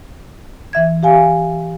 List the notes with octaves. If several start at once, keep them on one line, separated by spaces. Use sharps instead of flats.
E3 E5 G#6
G4 F5 G#5